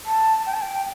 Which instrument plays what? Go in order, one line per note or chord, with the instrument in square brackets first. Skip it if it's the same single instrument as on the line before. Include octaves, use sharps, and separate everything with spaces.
[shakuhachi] A5
G5
A5
G5